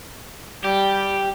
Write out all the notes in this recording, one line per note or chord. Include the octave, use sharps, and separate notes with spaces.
G3 G4